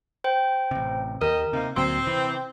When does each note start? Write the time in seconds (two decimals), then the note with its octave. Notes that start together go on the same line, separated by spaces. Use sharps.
0.24 C5 G5
0.71 A1 C3
1.21 D#2 G4 A#4 D#5
1.53 C3 A#3 C4 D#4
1.76 D2 A#2 F#3 C4 C6
2.07 C3 E3